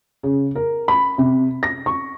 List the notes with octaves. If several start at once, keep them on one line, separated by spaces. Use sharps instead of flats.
C#3
A#4
B5
C3
A#6
C#6